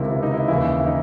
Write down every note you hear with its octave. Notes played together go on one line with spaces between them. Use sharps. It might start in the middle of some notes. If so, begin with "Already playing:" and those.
Already playing: C#2 C3 D#3 E4
E4
D#4
E4
D#2 C#3 E3 E4
E4
D#4